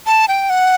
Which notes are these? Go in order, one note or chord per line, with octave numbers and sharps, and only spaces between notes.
A5
G5
F#5